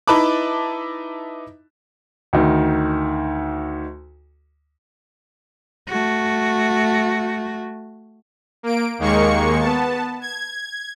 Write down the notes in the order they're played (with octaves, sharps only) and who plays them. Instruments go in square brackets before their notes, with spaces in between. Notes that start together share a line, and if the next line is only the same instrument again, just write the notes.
[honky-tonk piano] D#4 E4 B4 A5 B5 D6
[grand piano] D2 D#3
[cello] A3 F#4
[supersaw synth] A#3 D7
D#2 D#3 G#3 A#3 C#6 C#7
B3 A5
G#6